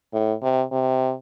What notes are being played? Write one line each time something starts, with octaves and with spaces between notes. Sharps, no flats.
A2
C3
C3